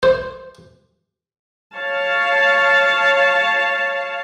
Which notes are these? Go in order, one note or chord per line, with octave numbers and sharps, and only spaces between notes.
C5
C#5 F5 A5